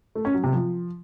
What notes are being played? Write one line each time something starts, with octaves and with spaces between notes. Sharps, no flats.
A3
C#4
F#3
C3
F3